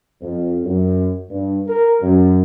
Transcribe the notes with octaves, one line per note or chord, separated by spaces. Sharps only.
F2
F#2
G2
A#4
F#2